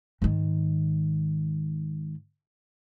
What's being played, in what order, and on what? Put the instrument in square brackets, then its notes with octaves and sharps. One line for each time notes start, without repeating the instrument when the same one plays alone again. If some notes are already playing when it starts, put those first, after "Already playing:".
[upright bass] G#2 D#3